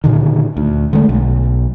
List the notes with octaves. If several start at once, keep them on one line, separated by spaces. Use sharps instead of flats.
A#2 D3 D#3
D2
D3 G#3 A3
B1